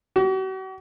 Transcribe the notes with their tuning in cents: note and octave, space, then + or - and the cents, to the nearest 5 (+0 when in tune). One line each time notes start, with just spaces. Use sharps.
F#4 +45